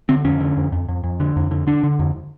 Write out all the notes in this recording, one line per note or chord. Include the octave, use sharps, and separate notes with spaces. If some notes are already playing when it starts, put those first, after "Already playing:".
D3 C4
F2 C#4
D3
F2
F2
F2
F2
D3
F2
D3
D3 D4
D3
F2